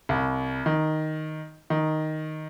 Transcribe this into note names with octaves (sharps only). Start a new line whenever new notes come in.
C2
D#3
D#3